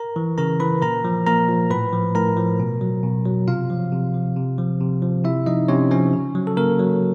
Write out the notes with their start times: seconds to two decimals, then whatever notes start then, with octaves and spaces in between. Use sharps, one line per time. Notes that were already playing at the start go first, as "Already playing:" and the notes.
Already playing: A#4 A#5
0.16 E3
0.38 C#3 A#4 A#5
0.60 E3 B4 B5
0.82 A#2 A#4 A#5
1.05 F3
1.26 A#2 A#4 A#5
1.49 F3
1.70 A2 B4 B5
1.93 F3
2.15 A2 A#4 A#5
2.37 F3
2.60 B2
2.81 F#3
3.03 B2
3.26 F#3
3.48 C3 F4 F5
3.70 F3
3.92 C3
4.14 F3
4.36 C3
4.58 F3
4.81 C3
5.02 F3
5.24 C3 E4 E5
5.46 F3 D#4 D#5
5.68 C3 C#4 C#5
5.91 F3 C#4 C#5
6.13 C#3
6.35 F#3
6.47 A4
6.57 C#3 A#3 A#4
6.79 F#3